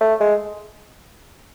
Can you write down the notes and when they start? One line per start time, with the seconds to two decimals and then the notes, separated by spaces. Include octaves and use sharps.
0.01 A3
0.20 G#3